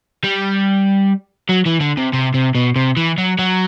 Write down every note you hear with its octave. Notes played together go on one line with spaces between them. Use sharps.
G3
F#3
E3
D3
C3
C3
C3
B2
C3
E3
F#3
F#3